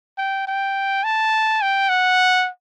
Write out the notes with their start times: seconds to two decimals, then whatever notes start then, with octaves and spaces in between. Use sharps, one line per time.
0.17 G5
0.47 G5
1.04 A5
1.62 G5
1.89 F#5